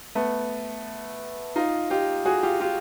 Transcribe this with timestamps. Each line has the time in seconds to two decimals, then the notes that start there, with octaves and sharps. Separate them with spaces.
0.15 A3 B3
1.56 D#4 F4
1.90 F4 G4
2.26 F#4 G#4
2.43 F4 G4
2.60 F4 G4